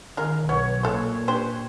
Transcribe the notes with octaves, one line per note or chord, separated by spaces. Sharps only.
D#3 G#3 F4 A#4
B1 B3 C#5
A#2 A4 C5
D4 G4 C5